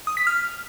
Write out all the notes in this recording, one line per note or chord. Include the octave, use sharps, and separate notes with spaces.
D#6
B6
F6